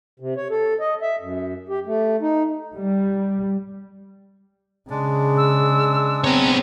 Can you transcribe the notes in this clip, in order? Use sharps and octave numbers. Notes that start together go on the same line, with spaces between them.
C3
C#5
A4
D#5
E5
F#2
G4
A3
D#4
G3
C#3 G#3 D4
E6
B3 C4 C#5 A#5